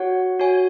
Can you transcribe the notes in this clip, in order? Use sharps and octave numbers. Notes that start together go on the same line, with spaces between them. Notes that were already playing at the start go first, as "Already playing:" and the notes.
Already playing: F#4 C#5 F#5
F#4 C#5 G#5